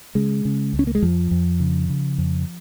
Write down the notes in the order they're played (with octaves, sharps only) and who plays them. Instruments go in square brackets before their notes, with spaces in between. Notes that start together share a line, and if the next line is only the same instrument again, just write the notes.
[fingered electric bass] C#3 G#3
C#3
C#2
C#4
A#3
G#3
F2 F3
F2
C#3
C#3
F2